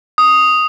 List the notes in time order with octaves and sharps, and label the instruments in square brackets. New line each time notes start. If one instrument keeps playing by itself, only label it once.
[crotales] D#6